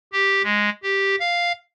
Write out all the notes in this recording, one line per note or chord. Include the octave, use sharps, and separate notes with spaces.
G4
G#3
G4
F5